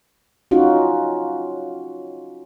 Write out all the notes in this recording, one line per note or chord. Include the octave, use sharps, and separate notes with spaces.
C#4 D#4 F4 F#4